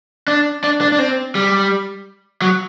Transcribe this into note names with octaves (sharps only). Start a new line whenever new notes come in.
D4
D4
D4
D4
C4
G3
F#3